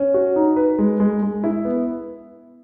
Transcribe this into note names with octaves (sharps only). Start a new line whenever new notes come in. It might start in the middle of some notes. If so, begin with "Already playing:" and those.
Already playing: C#4
F#4
D#4
B4
G#3
G#3
G#3
E4
B3